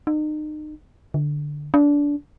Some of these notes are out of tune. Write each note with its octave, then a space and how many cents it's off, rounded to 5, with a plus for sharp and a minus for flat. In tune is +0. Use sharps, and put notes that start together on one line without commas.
D#4 -35
D3 +5
D4 -20